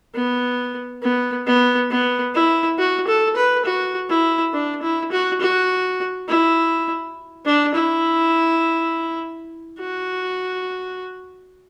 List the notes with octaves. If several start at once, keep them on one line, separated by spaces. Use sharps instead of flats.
B3
B3
B3
B3
E4
F#4
A4
B4
F#4
E4
D4
E4
F#4
F#4
E4
D4
E4
F#4